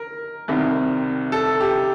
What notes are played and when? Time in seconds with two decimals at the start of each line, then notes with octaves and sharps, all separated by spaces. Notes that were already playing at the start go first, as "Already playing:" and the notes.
Already playing: A#4
0.48 C2 C3 D#3
1.32 A4
1.60 G4